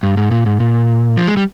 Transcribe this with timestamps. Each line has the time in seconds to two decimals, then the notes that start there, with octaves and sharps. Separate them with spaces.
0.03 G2
0.17 G#2
0.31 A#2
0.46 G#2
0.60 A#2
1.17 F3
1.27 G#3
1.37 G3